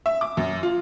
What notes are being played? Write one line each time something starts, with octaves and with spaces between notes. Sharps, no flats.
E5
D6
F#2
F4